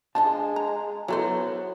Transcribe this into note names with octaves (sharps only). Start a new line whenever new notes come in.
F3 G#3 D4 D#5 A5
A#5
F#3 B3 E4 A4 C5